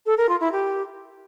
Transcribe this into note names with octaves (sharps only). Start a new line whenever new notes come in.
A4
A#4
F4
E4
G4